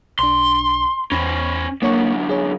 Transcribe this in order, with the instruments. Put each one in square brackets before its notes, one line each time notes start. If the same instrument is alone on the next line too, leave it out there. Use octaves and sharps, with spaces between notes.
[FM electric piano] B1 D4 [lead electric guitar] C6
[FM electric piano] E2 B5 A#6 [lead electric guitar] C#4 C5
[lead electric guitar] F#2 D3 [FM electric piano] A#3 C#5 C#6
[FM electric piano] G#4 C#5